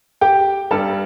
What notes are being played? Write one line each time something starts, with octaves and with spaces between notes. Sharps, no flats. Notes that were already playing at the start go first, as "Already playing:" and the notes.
G4 G5
G2 G3 A4 A5